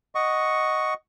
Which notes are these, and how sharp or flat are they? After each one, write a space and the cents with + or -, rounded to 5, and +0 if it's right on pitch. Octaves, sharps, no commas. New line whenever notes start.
D#5 +0 F#5 +0 C#6 +5